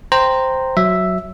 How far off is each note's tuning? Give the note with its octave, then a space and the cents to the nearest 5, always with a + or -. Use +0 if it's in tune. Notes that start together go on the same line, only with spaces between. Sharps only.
C5 +0 G5 +0 A#5 -10
F#3 +0 E5 +0